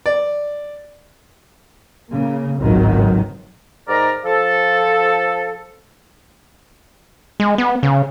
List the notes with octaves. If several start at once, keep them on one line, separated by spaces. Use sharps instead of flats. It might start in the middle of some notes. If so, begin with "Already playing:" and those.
D5
C#3 A#3
G#1 C#2 A2 D#3 F#3
G#2 D#3 A#4 D5 A#5
F3 A4
G#3
B3
C#3